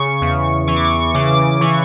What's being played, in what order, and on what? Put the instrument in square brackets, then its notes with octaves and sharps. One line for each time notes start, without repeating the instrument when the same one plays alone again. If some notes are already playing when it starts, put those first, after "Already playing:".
Already playing: [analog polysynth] C#3 C#6
E2
E3 C#6
D6
C#6
C#3 D6
E3 C#6